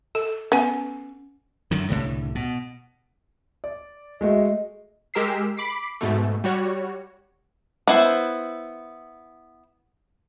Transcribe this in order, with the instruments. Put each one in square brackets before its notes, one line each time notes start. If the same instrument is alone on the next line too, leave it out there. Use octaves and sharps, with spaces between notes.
[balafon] A4
[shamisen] B3 [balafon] C#4 G#5
[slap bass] F#2 D3 D#3
C2 A2 D3
B2
[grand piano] D5
[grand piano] G#3 A3 F#4 [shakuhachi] D#5
[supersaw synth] G#3 G4 A#4 E6 B6 C7
B5 D6 B6 C7
G#2 B2 A3
G3 F#4 C#5
[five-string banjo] B3 E4 C5